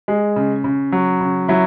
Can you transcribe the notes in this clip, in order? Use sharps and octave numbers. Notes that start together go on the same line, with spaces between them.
G#3
C#3
C#3
F#3
C#3
F#3 E4